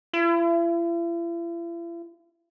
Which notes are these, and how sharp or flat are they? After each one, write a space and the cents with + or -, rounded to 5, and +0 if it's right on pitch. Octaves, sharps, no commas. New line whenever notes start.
E4 +45